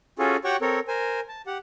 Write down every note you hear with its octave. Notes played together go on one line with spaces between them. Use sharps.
C#4 F4 F#4 G#4 A4
F#4 G4 C#5 F#5 G5 C#6
C4 A4 A#4 C#5
A#4 C5 G#5
A5
G4 F#5